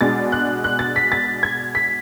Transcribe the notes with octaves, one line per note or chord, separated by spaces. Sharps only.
B2 G#3 D4 A6
F#6
F#6
A6
B6
A6
G#6
B6